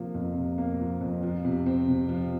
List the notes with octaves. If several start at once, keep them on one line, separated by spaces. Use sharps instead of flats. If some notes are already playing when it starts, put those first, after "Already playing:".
Already playing: C3 F3 A#3
F2
C3
A#3
F3
F2
F3
C3
C4
C3
F3